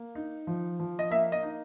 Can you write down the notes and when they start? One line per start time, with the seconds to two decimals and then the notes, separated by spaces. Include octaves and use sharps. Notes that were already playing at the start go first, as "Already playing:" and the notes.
Already playing: A#3
0.15 D#4
0.47 F3
0.79 F3
0.99 D#5
1.10 A#3 E5
1.32 D#5
1.43 D#4